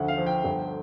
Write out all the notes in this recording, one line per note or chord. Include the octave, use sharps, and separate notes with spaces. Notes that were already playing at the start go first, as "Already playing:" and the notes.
Already playing: D2 F3 F#5
F5
F3
G5
G1